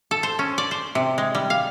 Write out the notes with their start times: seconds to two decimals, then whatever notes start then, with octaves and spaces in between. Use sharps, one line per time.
0.11 A4
0.23 C5
0.39 C#4
0.58 D5
0.71 C5
0.95 C3
1.18 G#3
1.35 G3
1.50 F5